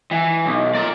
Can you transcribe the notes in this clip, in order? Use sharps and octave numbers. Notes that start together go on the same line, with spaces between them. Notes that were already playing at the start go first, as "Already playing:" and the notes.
E3
B1
A#4 D5